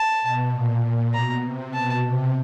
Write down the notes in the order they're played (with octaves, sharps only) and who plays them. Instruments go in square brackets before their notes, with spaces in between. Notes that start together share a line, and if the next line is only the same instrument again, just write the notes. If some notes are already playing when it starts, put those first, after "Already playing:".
Already playing: [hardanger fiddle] A5
[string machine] B2
A#2
A#2
[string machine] B2 [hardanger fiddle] A#5
[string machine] C3
[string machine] B2 [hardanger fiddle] A5
[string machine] C3